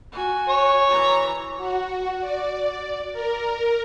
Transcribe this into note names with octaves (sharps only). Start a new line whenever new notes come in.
F#4 G#5
C#5
E3 A#5
F#4
D5
A#4